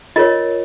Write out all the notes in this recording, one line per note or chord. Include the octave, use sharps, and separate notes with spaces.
F4 A#4 C#5 D#5